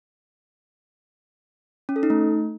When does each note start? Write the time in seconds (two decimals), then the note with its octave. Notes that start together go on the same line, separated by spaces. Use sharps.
1.89 C#4
1.96 A4
2.03 D#4
2.10 A3